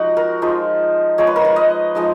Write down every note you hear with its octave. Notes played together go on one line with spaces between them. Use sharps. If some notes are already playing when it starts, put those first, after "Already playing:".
Already playing: F3 G#3 D#4 F#4
A#4
F3 G#3 D#4
F3 G#3 D#4 C#5
B4
A#4
B4
D#5
F3 G#3 D#4